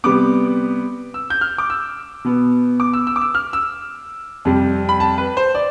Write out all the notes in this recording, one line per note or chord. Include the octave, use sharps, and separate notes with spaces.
C3 G3 B3 D6
E6
G6
F6
D6
E6
B2 B3
D6
E6
E6
D6
E6
F6
E6
F2 C3 G3
B5
A5
B4
C5
D5